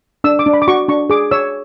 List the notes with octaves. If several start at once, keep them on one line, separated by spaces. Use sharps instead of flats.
D4 E6
D6
D4
B5
D6
F#4 C#6
D4 C#6
G#4 D6
C#5 E6